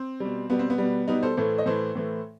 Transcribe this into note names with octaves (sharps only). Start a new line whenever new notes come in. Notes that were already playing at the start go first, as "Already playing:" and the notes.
Already playing: C4
B2 G3
B2 G3 B3
C4
B3
B2 G3
B2 G3 B3 D#4
A4 C5
A2 E3 A3 A4 C5
D#5
A2 E3 A3 A4 C5
A2 E3 A3